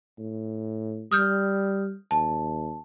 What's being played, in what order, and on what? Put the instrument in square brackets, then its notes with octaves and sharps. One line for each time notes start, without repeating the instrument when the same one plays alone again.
[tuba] A2
[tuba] G3 [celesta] D#6 F6 G6
[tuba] D#2 [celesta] A5